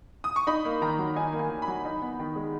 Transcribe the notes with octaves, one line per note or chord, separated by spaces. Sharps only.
D#6
C#6
D#4 B5
A#3
D#3 A#5
F#3
D#4 G#5
A#3
G#5
D#3
B5
F#3
D#4
B3
D#3
G#3